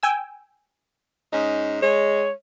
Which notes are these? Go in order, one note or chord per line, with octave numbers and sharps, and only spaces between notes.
G5 G#5 E6
G#2 C#4 D#4
G#3 C#5